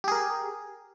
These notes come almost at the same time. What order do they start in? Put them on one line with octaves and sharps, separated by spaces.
G4 G#4 A#4